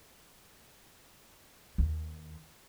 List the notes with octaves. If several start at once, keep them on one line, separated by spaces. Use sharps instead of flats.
D#2